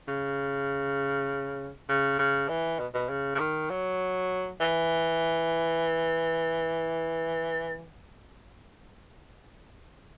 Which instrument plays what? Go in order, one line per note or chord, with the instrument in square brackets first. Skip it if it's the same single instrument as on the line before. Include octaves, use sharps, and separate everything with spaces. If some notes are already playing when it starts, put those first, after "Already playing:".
[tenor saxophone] C#3
C#3
C#3
E3
B2
B2
C#3
C#3
D#3
F#3
E3